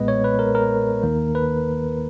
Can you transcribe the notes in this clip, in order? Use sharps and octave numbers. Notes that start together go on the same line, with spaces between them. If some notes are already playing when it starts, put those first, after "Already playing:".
Already playing: B1 A#2 G#3 B3 B4 D#5
C#5
B4
A#4
A#4
D#2 D#3 A#3
B4